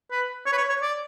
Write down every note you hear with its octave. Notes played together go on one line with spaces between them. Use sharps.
B4
C#5
B4
C#5
C#5
D5